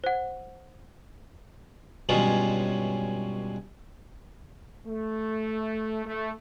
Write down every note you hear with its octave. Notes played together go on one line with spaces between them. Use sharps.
C5 F#5
G2 B2 F#3 G#3 C#4 F4
A3
A3